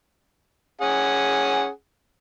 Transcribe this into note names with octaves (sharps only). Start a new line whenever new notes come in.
C#4 G#4 F#5